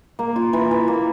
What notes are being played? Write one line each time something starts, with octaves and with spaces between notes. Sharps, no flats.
A#3
F4
E3
E3
A#3